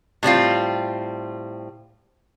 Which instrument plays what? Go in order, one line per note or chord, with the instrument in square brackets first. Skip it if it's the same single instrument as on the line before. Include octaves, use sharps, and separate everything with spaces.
[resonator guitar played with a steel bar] A2 G3 C4 F4